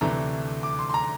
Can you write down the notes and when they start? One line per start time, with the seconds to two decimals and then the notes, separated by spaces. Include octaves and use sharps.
0.01 D2 C3 E3 A3 D4 A#5
0.63 D6
0.79 C6
0.89 C6
0.94 A#5